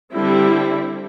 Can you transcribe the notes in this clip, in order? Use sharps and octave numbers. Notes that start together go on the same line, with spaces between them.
D3 G3 C4 E4